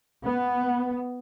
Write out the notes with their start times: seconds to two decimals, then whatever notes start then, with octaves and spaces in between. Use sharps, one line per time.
0.25 B3